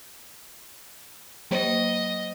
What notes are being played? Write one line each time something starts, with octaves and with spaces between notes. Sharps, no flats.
F#3 A#3 C5 D#5